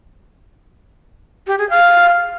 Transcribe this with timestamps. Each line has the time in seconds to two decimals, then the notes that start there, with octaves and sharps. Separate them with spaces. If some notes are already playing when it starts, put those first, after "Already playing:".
1.47 G4
1.58 G#4
1.70 F5